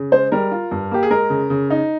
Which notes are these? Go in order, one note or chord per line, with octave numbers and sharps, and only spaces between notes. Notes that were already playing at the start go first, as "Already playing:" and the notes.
Already playing: C#3
G#3 C5
G3 A#4
F4
G2
A#3 G4
G#4
G#3 A#4
C#3
C#3
D#4